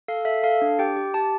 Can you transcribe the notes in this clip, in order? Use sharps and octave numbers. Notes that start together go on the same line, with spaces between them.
A4 F5
A4 E5
A4 F5
D4
G4 G5
G4
G4 A5